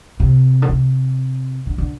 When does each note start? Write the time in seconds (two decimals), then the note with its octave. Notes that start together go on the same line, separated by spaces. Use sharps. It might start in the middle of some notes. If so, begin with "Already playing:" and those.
0.20 C3
0.62 D3
0.69 C3
1.67 D3
1.78 D3